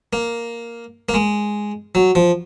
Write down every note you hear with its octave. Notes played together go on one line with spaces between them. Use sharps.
A#3
A#3
G#3
F#3
F3